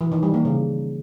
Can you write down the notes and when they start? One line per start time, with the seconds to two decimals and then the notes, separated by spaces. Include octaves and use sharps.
0.01 E3
0.12 D#3
0.23 G3
0.34 A#3
0.45 C#3